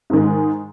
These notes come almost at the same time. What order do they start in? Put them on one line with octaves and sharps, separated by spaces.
G#2 D#3 G#3